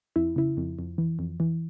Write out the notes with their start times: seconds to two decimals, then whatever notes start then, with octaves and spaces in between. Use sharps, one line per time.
0.16 F2 E4
0.36 C#3 E4
0.57 F2
0.79 F2
0.98 E3
1.19 F2
1.40 E3